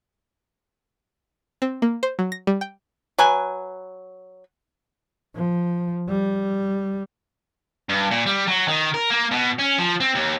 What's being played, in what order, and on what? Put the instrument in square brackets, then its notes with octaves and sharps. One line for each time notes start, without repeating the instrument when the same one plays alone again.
[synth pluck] C4
A#3
C5
F#3
A#6
G3
G5
[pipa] F#3 B4 G#5
[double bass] F3
G3
[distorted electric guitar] G2
A#2
G3
F#3
D#3
A#4
A#3
B2
C#4
F3
C4
D#2